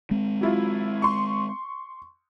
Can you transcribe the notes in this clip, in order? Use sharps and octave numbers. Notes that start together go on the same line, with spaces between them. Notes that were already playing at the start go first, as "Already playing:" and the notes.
G#3 C4
F#3 E4 F4
C6 C#6